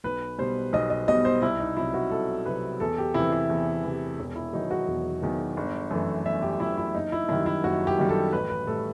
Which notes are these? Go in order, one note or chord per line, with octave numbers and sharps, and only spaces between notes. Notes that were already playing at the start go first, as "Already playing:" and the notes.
B1 B4
B2 G3 C5
B1 D#5
D#5
B2 G3 D#5
C5
C2 E4
D#4
C3 F#3 E4
F#4
C2 A4
C3 F#3 B4
E2 A4
G4
C3 E3 E4
E4
E2
C3 E3
E1
E4
E2 D#3 F#3 D#4
F#4
E1
E2 D#3 F#3
G1
F#2 E3 A3
G1 E5
G4
F#2 E3 A3 E4
E4
F#1 D#4
E4
F#2 D#3 G3 E4
E4
F#1 F#4
G4
F#2 D#3 G3
A4
A1 B4
B4
A2 G3 A4